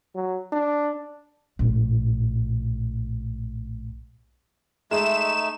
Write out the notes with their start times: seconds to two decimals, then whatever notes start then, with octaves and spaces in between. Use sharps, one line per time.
0.15 F#3
0.52 D4
1.59 A#1 A2
4.91 G#3 A3 D#4 E5 E7